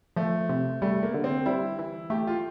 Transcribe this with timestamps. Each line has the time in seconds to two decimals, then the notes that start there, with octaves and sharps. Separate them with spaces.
0.16 F3 A3
0.49 C3
0.82 G3 A3
1.03 A#3
1.14 D3
1.24 C4
1.46 G3 E4
1.79 E3
2.10 A3 G4
2.27 F4